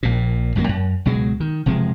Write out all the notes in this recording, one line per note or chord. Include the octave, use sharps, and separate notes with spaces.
A#1 A#2
G1 F#2 F#3 A#3
F#2
C#2 B2 F#3 G#3
D#3
E1 C3 F3 G#3